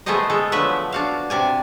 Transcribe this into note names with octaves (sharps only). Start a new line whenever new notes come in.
A3 B3 G#4 A4 C5 D#5
G#3 A4
D3 F3 F#3 A3 B4 E5
D4 F#4 F5
C3 D4 G#5